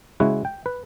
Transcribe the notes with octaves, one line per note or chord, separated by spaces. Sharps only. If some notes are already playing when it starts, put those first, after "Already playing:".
C#3 G#3 E4 F#4 F#5
G5
B4